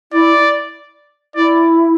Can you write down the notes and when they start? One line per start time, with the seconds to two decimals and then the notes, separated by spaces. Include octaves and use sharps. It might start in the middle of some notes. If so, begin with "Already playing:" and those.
0.12 E4 D5
1.35 E4 D5